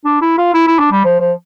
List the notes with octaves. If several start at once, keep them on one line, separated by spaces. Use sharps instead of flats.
D4
E4
F4
E4
E4
D4
G3
F3
F3